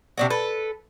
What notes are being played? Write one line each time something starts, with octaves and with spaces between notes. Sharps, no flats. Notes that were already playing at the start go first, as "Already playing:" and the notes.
C3 D4 F#4
A4 B4